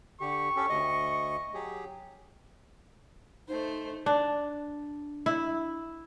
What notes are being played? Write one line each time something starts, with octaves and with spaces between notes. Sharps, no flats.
D3 G4 C#6
C#4 G4 A4
D2 D#5
F#3 G4 G#4
A3 D#4 C5
D4
E4